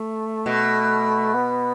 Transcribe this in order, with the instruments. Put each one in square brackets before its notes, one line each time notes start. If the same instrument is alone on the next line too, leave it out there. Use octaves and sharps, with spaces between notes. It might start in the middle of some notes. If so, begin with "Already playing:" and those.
Already playing: [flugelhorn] A3
[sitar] B2
[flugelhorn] B3